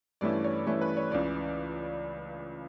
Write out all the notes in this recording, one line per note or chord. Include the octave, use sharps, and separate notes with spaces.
G2 E3 A3 C#4 E4 D5
C#5
G2 E3 A3 C#4 E4 C#5
B4
C#5
C#2 C#3 E3 D5